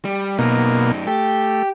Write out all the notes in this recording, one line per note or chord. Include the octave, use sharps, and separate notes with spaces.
G3
F#2 B2 A#3 D#4
A3 G4